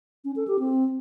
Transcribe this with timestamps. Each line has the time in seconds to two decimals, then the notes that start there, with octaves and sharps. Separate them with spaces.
0.25 C#4
0.36 A4
0.48 G4
0.59 C4